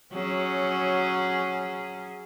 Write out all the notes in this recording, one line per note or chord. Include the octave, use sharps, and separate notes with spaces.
F#3 C#4 G#4